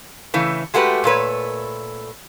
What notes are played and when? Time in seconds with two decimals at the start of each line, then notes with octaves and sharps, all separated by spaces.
0.34 C#3 E3 A3
0.74 G#3 A3 F#4 G4 B4
1.04 A#2 A3 B4 C#5